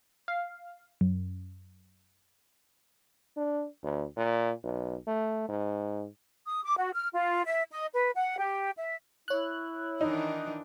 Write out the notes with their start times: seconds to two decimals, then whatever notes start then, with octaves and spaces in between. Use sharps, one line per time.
0.28 F5
1.01 F#2
3.37 D4
3.83 D2
4.17 A#2
4.64 B1
5.07 A3
5.49 G#2
6.46 D#6
6.64 D6
6.77 F#4
6.94 F6
7.13 F4
7.46 E5
7.72 D#5
7.94 B4
8.15 F#5
8.38 G4
8.77 E5
9.28 E4 C#5 F#6
10.01 D#3 E3 D4 D#4